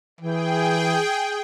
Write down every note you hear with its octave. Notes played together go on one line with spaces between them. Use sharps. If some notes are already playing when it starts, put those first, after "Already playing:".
E3 G#4 G5